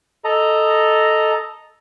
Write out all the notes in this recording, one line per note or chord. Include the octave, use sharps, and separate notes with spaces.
A4 D#5 A#5